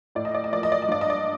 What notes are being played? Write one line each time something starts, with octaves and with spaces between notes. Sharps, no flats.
A2 D5
D#5
D5
D#5
F3 A#3 D5
D#5
D5
D#5
G2 D5
D#5
D5